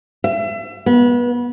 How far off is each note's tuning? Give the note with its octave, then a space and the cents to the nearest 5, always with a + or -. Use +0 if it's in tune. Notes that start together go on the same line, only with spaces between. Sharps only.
E5 +35
B3 -25